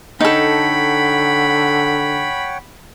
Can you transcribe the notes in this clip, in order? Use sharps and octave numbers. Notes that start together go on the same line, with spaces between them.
D3 D#4 A4 C#5 F#5 G5 B5